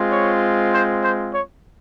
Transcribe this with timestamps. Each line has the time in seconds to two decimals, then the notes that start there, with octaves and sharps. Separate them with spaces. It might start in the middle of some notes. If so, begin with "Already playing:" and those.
Already playing: G#3 C4 F4
0.11 C#5
0.72 C5
1.02 C5
1.32 C#5